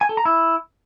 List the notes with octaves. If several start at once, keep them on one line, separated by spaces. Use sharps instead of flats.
G#5
A4
A#5
E4